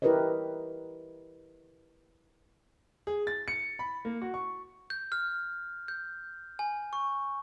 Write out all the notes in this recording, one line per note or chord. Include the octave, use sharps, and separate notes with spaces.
E4 G4 A#4 B4 C#5 D#5
G#4
A6
C#7
B5
A#3
F#4
C#6
G6
F6
G6
G#5
C#6